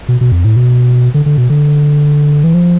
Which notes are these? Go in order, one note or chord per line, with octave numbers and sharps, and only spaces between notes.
B2
B2
F2
A2
B2
D3
D3
B2
D3
E3
F3